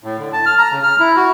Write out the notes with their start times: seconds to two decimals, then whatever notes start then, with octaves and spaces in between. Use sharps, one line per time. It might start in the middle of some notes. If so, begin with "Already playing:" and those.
0.04 A2
0.19 D3
0.33 A5
0.46 F6
0.58 A#5
0.71 C#3
0.83 F6
0.99 E4
1.16 F#4